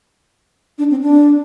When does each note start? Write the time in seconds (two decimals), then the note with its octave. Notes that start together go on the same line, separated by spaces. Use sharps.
0.78 D4
0.90 C4
1.02 D4